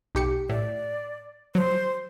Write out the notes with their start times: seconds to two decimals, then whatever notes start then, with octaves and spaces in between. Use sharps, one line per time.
0.15 B1 G4 C#7
0.50 A2 D5
1.55 F#3 C5